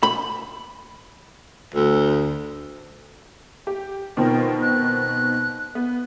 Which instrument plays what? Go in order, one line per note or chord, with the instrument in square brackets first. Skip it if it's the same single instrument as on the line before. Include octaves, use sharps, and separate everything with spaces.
[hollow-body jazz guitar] B5
[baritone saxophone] D2
[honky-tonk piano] G4
[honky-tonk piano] B2 D#3 C4 [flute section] F4 A#4 G5
[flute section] F#6
[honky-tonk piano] B3